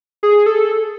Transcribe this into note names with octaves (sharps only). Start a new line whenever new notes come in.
G#4
A4